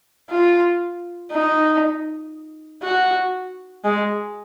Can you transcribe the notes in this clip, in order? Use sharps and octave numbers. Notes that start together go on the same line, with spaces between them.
F4
D#4
F#4
G#3